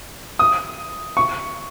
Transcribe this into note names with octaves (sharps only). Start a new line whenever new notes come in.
D#6
C#6